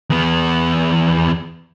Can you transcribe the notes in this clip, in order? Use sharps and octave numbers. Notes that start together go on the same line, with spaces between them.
E2 B3